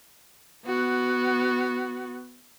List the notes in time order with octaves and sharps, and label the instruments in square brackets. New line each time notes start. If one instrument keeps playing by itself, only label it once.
[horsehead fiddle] B3 F#4